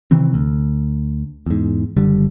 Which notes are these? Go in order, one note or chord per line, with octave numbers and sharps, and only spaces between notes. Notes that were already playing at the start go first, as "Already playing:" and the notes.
C3 D#3 E3 C4
D2
E2 G#2
F#1 D3 G3